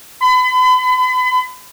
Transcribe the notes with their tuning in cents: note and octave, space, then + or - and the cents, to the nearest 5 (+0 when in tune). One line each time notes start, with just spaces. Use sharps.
B5 +40